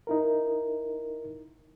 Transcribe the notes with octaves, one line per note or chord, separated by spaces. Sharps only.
D#4 E4 A#4